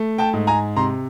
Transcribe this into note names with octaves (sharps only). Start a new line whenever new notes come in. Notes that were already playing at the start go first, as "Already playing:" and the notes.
Already playing: A3
G5 A5
G#2
G#5 A#5
C3 A#5 C6